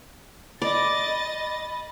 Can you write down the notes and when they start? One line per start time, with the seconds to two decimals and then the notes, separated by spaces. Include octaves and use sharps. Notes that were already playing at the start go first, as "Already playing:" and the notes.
0.62 D5 D#5 B5 A6